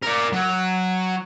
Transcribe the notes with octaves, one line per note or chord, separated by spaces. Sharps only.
A#4 D5
F#3